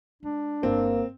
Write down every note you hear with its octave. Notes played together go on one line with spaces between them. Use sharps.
G#3 D4
G1 A#3 C4